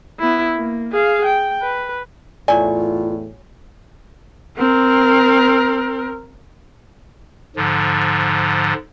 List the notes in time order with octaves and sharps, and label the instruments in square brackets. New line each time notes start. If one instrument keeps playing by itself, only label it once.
[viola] B3 E4
A#3
G#4 F5
G5
B4
[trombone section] E2 A2 [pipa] F#3 G#5 [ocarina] F4 [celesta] D5
[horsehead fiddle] C4 A#4
[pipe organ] G#2 D3 F3